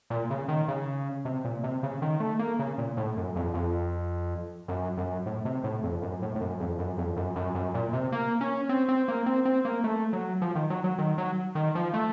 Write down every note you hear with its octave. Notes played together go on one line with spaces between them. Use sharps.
A#2
C#3
D#3
C#3
C3
A#2
C3
C#3
D#3
A3
A#3
C#3
A#2
A2
F#2
F2
F2
F#2
F#2
A2
C3
A2
F2
F#2
A2
A2
F#2
F2
F#2
F2
F#2
F#2
F#2
A#2
C3
A#3
C#4
C4
C4
A#3
C4
C4
A#3
A3
F#3
F3
D#3
F#3
F#3
D#3
F#3
D#3
F3
A3